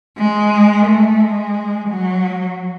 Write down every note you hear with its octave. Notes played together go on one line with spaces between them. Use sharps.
G#3
A3
G#3
F#3